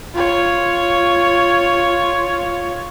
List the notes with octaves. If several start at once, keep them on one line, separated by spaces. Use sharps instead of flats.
F4 C#5